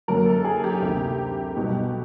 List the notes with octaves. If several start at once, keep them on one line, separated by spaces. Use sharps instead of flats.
F#2 D3 F#3 A#3 A#4
A4
G#4
G4
D2 C3 D#3
B1 B2 G3